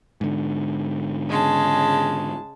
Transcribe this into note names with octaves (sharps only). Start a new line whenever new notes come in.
G#2 D3
C#3 G#3 A5